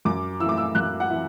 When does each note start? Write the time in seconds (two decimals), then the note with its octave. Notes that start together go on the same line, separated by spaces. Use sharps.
0.05 F#2 D6
0.40 E3 E6
0.45 A3 D6
0.57 E6
0.75 F#2 F#6
1.00 F#5
1.10 E3 E5